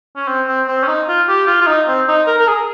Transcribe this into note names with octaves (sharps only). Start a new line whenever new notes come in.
C#4
C4
C4
C4
C#4
D#4
F4
G4
F4
F4
D#4
C4
D#4
A#4
A#4
G#4